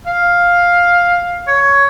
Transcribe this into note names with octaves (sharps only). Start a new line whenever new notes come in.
F5
C#5